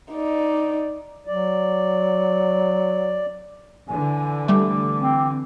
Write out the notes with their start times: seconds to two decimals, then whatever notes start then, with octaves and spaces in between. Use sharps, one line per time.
0.13 D#4 D5
1.27 F#3 D5
3.88 D3 E3 G#5
4.48 G3 A3 D6
4.99 C4